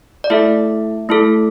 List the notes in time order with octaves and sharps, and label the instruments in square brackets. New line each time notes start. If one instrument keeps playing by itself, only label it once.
[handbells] D5
A3 E4 A4 E5
A3 E4 A4